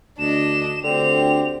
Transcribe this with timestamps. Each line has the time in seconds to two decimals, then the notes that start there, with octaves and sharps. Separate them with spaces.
0.19 D2 D4 D#5 E7
0.83 D2 D3 C4 G4 F7